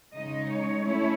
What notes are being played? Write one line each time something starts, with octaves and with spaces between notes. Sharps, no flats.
C#3 G#3 D#4 D#5
C#5
A3 C#4 E4